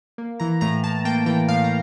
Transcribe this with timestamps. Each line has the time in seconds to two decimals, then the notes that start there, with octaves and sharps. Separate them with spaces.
0.18 A#3
0.40 E3 A#5
0.61 A2 A#5
0.84 A2 A5
1.05 A#3 G5
1.26 E3 G5
1.48 A2 F5
1.64 A#5